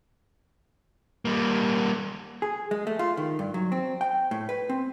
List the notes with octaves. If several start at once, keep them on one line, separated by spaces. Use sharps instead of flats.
G3 A#3
G#4
G#3
A3
F4
D#3
G2
F#3
C4
G5
A2
B4
C4